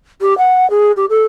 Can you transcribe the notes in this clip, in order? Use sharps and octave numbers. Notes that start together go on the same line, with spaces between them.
G4
F#5
G#4
G4
A4